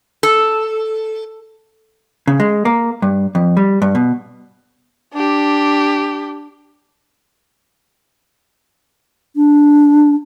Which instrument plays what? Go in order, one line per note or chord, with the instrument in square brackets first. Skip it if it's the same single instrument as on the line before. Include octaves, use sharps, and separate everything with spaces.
[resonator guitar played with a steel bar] A4
[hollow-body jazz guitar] C#3
G#3
A#3
G2
F2
G3
G2
B2
[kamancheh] D4 G4
[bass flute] D4